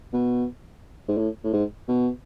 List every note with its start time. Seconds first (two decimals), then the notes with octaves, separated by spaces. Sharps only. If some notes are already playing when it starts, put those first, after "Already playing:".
0.13 B2
1.08 G#2
1.18 A2
1.44 A2
1.53 G#2
1.88 B2